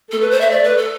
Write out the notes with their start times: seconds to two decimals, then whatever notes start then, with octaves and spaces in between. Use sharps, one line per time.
0.11 A3 A4
0.21 B4
0.31 C5
0.41 E5
0.51 D5
0.64 B4
0.78 A4